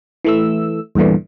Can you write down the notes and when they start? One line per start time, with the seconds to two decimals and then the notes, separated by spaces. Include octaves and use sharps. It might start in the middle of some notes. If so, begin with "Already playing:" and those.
0.25 E3 A3 E6
0.95 E2 G2 A#2 D3 E3